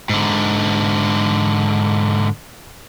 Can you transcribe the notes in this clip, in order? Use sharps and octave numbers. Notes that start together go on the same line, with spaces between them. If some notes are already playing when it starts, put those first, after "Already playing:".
G#2 D3